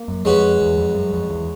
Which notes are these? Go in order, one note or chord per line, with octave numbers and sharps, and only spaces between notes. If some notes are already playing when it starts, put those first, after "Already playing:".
Already playing: A#3
F#2
F2 G#3 C#4 F#4 B4
E2
F2
F#2
F2
E2